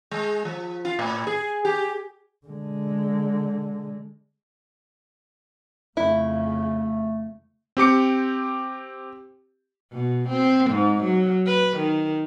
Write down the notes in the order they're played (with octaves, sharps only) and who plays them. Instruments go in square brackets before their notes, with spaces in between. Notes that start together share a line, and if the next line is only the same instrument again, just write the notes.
[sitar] G#3
F3
F4
A2
G#4
G4
[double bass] D3 G#3
[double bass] F2 C#3 [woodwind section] A3 [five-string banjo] E4
[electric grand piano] C4 G4 D6 C#7
[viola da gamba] B2
C4
G#2
F#3
B4
D#3